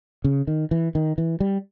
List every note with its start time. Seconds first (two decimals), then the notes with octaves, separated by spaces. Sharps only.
0.24 C#3
0.47 D#3
0.71 E3
0.95 D#3
1.18 E3
1.40 G3